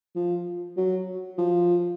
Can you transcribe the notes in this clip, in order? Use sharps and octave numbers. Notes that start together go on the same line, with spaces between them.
F3
F#3
F3